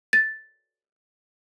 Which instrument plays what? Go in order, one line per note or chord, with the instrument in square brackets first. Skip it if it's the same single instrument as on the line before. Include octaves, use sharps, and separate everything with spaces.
[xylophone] A6